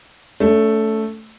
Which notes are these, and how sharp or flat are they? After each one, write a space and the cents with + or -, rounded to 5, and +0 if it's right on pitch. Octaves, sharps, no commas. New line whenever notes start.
A3 +0 C#4 +45